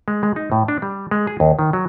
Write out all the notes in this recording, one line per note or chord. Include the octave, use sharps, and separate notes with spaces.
G#3
G#3
D#4
A2
D4
G3
G#3
G#4
D#2
D#3
F#3